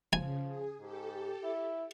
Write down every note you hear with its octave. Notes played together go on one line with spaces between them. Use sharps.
C#3 F3 G#5
G#4
G#2 G4 A4
E4